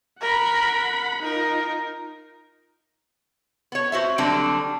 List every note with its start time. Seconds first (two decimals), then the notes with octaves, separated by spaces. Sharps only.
0.21 A#4 F#5 B5
1.23 D#4 F4 A#4
3.72 B3 C#5
3.92 F#4 C5 E5
4.18 D3 F#3 G3 C4 D4